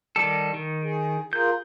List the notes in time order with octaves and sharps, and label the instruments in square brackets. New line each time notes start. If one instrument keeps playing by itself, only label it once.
[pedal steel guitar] D#3 G3 A4
D#3
[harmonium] G#4
[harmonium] F4 G#4 A#4 [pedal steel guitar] G6